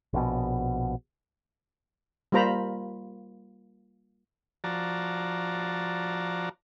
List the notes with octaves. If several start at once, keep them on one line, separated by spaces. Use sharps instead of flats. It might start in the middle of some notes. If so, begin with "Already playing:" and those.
A#1 B2
G3 A#3 F4 C5 A#5 B5
F3 F#4 D5 A5 A#5